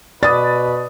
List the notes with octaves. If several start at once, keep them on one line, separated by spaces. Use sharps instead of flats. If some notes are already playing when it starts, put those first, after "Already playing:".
B2 B4 D5 D#6 A6